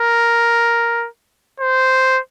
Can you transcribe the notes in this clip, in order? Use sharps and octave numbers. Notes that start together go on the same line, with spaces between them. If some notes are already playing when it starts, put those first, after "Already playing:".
Already playing: A#4
C5